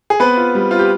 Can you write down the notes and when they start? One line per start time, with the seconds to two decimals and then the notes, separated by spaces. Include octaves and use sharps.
0.10 G#4
0.20 B3 C4 B4
0.37 F4
0.55 G3
0.71 C4 F4
0.79 G4